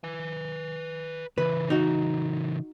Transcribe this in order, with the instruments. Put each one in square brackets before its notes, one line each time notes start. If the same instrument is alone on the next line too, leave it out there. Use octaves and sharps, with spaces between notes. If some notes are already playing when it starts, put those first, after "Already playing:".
[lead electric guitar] B4 G#5
[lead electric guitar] C#3 E3 [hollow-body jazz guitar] B4
[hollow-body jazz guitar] D#4 F#4